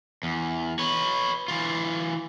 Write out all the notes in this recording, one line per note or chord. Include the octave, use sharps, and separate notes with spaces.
E2
B4 C#5
E3 F4